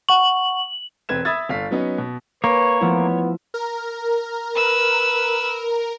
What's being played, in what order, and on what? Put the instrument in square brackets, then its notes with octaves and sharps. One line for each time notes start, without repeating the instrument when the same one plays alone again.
[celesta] F#5 C#6 [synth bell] F#7
[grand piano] E1 C4 B4 G#6 E7
E5 B5 D#6 E6 G#6 A6
G1 F5 B6
F#3 B3 C#4 D#4
B2
[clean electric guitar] A#3 [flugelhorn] B4 [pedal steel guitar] C#5
[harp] F3 A3 E4 [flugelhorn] B3
[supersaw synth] A#4
[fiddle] B4 E6